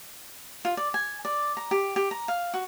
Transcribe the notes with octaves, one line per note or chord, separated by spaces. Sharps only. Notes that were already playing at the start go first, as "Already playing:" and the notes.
F4
D5
G#5
D5
A#5
G4
G4
A#5
F5
F#4